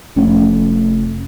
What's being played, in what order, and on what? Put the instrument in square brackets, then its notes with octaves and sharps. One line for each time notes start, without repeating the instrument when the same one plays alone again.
[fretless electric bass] F1 F2 A3 C#4